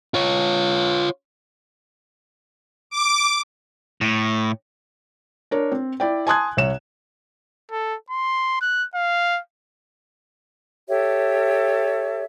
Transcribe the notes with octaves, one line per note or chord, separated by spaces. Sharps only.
F4 C#5
D6
A2
D4 A#4 C#5
C4
E4 D5 G5
G#5 A5 C6 D#6 F#6 G#6
C2 C#5 E7
A4
C6
F#6
F5
G4 A4 C#5 E5